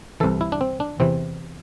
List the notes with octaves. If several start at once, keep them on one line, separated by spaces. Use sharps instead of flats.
C2 C3 E3 A4
E4
D4
C4
D4
E2 C3 E3 C4